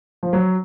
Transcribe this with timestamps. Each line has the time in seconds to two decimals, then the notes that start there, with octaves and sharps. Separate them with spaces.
0.23 F3
0.33 F#3